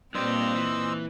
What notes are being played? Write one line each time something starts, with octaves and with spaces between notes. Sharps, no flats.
G2 A#2 C4 G4 C5 D#5 E6
E3